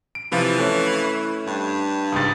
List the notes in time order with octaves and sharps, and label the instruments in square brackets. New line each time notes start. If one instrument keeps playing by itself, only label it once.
[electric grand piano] D7
[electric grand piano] C3 F3 F4 [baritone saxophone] E3
[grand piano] A3 C#4 [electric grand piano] F#6
[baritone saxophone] G2
[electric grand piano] C#2 G#2 [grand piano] D#6 A6